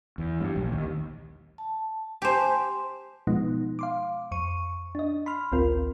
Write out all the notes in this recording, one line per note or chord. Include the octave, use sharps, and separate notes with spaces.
E2
G2
A#1
D#2
A5
G4 C5 G#5 A5 C6
B2 F3 G#3 B3 D#4
F5 C6 D6
F2 C#6 D#7
D4 D#5
B5 C6 F6
A1 D2 C4 F4 A#4